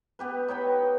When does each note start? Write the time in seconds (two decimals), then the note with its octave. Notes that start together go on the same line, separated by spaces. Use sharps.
0.19 B3 G4 B4
0.48 D#4 C#5 G5 B5